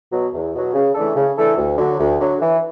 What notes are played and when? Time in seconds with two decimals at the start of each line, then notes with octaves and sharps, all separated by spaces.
0.11 B2 F#3
0.33 E2
0.54 B2 F#3
0.74 C#3
0.94 E3 A3 D4 A4
1.15 C#3
1.37 E3 A3 D4 A4
1.58 D2
1.78 D3 F#3
1.99 D2
2.20 D3 F#3
2.41 E3